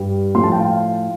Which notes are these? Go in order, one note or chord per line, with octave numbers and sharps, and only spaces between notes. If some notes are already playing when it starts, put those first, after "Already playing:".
Already playing: G2 G3
A2 F3 A3 C6
A5
G5
F5